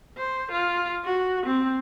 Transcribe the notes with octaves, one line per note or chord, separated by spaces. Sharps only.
C5
F4
F#4
C4